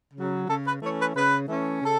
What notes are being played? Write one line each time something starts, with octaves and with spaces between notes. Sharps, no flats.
C#3 F#3
C#3 A4
B4
E3 A3 C#4 C#5
B4
C#3 B4
E3 A3 C#4
C#3 A4